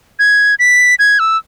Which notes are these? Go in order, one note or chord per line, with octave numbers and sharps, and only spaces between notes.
G#6
B6
G#6
E6